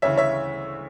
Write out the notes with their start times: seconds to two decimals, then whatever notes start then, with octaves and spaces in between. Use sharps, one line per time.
0.02 D2 C#3 E3 C#5 E5
0.18 C#5 E5